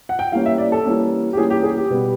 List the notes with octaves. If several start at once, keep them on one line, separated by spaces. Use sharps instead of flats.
F#5
G5
E3 G3 A#3 C#4 F5
E5
D5
A4
E3 G3 A#3 C#4
G4
E3 G3 A#3 C#4 G#4
G4
G#4
G4
B2 G3 B3